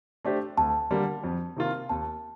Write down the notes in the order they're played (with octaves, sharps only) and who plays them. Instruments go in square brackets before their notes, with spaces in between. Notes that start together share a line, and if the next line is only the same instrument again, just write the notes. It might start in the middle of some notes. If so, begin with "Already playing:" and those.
[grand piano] A3 D4 G4 C5
[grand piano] D2 [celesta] A5
[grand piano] D3 G3 A#3
F2
C3 D#3 A#3 F4
[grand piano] D#2 [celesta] A5